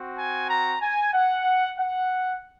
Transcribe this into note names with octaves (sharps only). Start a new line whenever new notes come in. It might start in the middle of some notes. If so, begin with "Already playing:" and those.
Already playing: C4 F#4
G#5
A#5
G#5
F#5
F#5